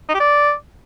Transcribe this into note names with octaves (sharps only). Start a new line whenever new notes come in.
D#4
G4
D5